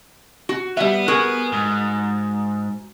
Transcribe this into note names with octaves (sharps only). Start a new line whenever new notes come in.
F#4
G3 B3 E5
F#4 G#4 A#4
G#2